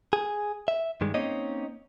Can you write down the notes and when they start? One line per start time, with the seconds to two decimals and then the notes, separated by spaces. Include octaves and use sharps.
0.13 G#4
0.68 E5
1.01 G2 D#3 G#3
1.14 A#3 C4 C#4 D#4 C#5 D#5